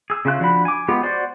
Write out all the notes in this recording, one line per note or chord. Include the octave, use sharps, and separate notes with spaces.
G#4 E6
C#3 C#4 F4 E5 F#6
F3 D4 F#4 B5
G#5 D6
G#3 B3 F4 G4
F#4 C5 D5 C6